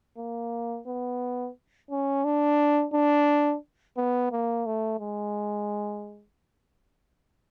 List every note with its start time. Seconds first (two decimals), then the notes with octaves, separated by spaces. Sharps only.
0.18 A#3
0.87 B3
1.91 C#4
2.24 D4
2.94 D4
3.97 B3
4.32 A#3
4.66 A3
5.00 G#3